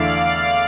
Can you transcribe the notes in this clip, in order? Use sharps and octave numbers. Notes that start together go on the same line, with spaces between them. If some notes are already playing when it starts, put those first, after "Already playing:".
Already playing: E2 D3 A3 E4 A4 D5 F5